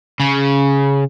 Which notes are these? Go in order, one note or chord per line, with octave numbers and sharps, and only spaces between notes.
C#3